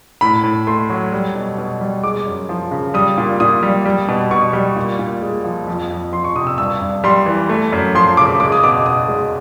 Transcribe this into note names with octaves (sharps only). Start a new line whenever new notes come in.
A2 B5
A2
A3 C6
F#3
G3
B2
B2
G3
G#3 D6
F#2
F3
C#3
G3 D#6
A#2
A#2 D#6
G3
G3
B2
B2 C#6
G3
A#2
A#2
G#3
F3
F2
F2
F3 C6
C#6
C3 D#6
E6
G2 E6
G2
G3 C6
E3
A3
F#2
F3 C6
C#3 D6
G#3 D6
D#6
B2 D6
B2 D#6
G#3